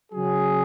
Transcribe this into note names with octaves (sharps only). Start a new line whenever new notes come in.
C#3 F#3 G#4